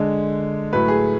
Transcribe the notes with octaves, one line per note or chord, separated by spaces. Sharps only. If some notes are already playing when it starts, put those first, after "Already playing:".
Already playing: D3 G#3
A2 F#3 A3 B4
G#4